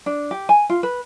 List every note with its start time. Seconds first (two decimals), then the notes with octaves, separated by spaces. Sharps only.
0.06 D4
0.31 G4
0.49 G#5
0.70 F4
0.83 B4